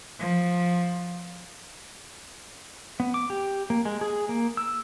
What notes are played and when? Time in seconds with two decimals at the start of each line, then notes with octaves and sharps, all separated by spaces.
0.19 F3
3.00 B3
3.14 D6
3.30 G4
3.70 A#3
3.85 G#3
4.01 G#4
4.29 A#3
4.57 E6